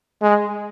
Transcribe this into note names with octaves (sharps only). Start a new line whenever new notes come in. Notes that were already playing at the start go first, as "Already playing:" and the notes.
G#3